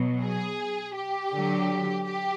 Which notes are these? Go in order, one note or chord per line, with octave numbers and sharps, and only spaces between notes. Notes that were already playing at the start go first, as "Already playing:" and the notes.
Already playing: B2 F#3
G#4
G4
D3 F#3
G4